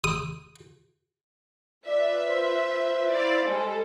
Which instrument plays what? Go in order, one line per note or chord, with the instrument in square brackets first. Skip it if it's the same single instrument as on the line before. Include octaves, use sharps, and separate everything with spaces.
[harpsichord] D#6
[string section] F4 B4 E5 [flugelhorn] D5
[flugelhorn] C5
[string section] E4 D5 F5
G3 G#3 A4